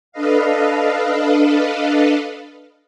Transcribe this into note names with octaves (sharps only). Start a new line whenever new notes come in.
D4 A4 B4 D#5 F5